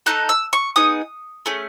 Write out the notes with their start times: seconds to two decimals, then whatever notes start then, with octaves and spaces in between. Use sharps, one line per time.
0.06 A3 D#4 A4 F#6
0.29 E6
0.53 C#6
0.76 B3 D#4 G#4 D#6
1.46 A3 C#4 G#4